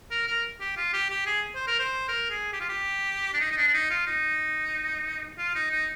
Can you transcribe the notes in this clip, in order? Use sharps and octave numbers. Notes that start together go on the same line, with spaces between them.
A#4
A#4
G4
F4
G4
G4
G#4
C5
A#4
C5
A#4
G#4
G4
F4
G4
D4
D#4
D#4
D4
D4
D#4
F4
D#4
F4
D#4
D#4